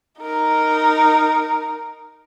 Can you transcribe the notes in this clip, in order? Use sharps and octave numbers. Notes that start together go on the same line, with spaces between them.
D#4 A#4